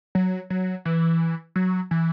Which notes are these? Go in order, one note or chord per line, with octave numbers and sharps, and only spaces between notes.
F#3
F#3
E3
F#3
E3